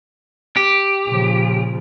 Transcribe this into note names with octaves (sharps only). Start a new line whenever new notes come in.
G4
A#2 C#3 F3